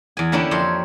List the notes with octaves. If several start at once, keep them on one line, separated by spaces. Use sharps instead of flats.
E2 G#5
D3 A#3 C#4 D4 E4 G4
F2 C5 C#5 C6